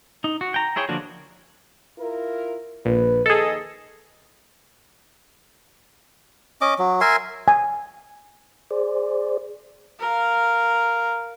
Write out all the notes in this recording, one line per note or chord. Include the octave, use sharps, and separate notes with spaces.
D#4
F#4
G5 A#5
E4 G#4 C#5 G5
D3 F3 A#3 D4 F#4
E4 F4 A#4
A#1 B4
D#2 D#3 G#4 A4 D#5
C#4 D#5 D6
F#3
A#4 E5 G#5 C6
G#5
G#4 C5 D5
A#4 F5